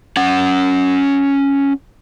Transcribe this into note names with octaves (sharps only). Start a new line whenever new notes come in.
C#4 F#5